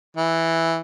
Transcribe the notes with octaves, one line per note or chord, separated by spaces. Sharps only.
E3